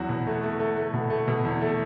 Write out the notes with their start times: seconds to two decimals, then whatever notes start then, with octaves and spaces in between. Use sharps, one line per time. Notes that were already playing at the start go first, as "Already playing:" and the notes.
Already playing: E2 F#3 F#4
0.09 B2
0.27 A3
0.43 A3
0.60 A3
0.77 A3
0.94 B2
1.10 A3
1.28 B2
1.45 E2
1.61 A3